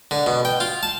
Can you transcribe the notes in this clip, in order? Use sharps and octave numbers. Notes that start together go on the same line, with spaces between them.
D3
B2
G5
F4
A5